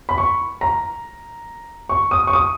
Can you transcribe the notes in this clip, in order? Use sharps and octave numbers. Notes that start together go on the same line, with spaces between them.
B5
C#6
A#5
C#6
D#6
C#6
D#6